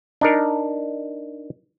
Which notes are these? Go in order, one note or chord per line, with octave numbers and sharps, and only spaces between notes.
D4 D#4 A#4